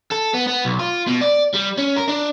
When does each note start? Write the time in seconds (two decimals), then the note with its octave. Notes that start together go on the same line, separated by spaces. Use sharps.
0.11 A4
0.33 B3
0.47 B3
0.65 B1
0.79 F4
1.07 B2
1.22 D5
1.55 G3
1.79 C#4
1.97 A#4
2.09 D4